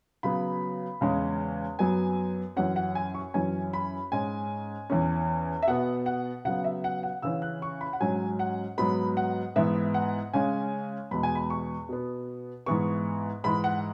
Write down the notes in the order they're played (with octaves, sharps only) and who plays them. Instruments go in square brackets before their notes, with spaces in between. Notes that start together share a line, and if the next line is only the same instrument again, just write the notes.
[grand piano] C#3 F#3 B3 B5
E2 C#3 G#3 C#4
F#2 F#3 B3 G#5
F#2 E3 C#4 F#5
F#5
G#5
C#6
F#2 E3 C#4 G#5
B5
G#2 G#3 C#4 G#5
E2 E3 C#4
E5
B2 B3 F#5
F#5
C#3 F#3 B3 F#5
E5
F#5
F#5
C#3 E3 C#4 E6
F#6
C#6
B5
F#5
G#2 F#3 C#4 G#5
F#5
G#2 F#3 B3 B5
F#5
G#2 E3 B3 E5
F#5
C#3 G#3 C#4 G#5
E2 B2 G#3 B5
G#5
B5
C#6
B2 B3
G#2 E3 B3 C#6
G#2 E3 G#3 B5
F#5